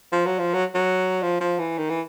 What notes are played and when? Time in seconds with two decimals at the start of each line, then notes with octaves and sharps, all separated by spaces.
0.12 F3
0.26 F#3
0.39 F3
0.54 F#3
0.74 F#3
1.23 F3
1.41 F3
1.59 E3
1.78 D#3
1.90 E3